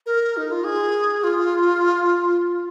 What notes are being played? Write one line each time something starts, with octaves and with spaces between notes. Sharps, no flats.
A#4
D#4
F4
G#4
F4